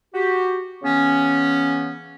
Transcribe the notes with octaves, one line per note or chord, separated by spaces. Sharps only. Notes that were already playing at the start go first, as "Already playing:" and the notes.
F#4 G4
C#3 E3 B3 C#4